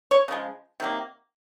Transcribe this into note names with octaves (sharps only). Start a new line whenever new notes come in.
C#5
C#3 F3 G#3
C3 D#3 F#3 A#3